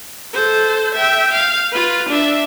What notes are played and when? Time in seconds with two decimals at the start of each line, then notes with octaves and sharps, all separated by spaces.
0.33 A4 C5
0.94 E5 G5
1.33 F5
1.71 F4 B4
2.09 D4 E5